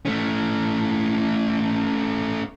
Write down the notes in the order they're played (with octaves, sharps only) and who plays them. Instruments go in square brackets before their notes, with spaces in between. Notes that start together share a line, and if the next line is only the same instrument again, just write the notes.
[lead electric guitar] A3 C#4